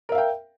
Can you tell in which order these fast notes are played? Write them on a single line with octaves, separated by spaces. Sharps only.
A#4 E5 F5 G5